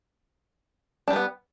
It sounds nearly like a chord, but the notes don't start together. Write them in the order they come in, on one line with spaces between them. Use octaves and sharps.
D4 G3 B4 B3